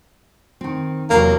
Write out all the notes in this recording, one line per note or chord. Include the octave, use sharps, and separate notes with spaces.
D#3 C4
E2 C3 F#3 A#3